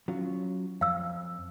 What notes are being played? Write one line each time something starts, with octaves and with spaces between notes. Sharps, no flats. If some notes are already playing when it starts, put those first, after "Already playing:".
F#3 C#4 F4
F2 F5 E6